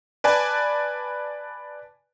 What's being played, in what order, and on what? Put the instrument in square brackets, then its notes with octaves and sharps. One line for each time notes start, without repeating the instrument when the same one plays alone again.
[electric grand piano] B4 D5 G#5 A5